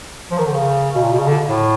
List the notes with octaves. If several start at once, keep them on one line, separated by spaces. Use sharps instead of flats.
F3
D#3
D3
C#3
B2
A#2
B2
C#3
D3
A2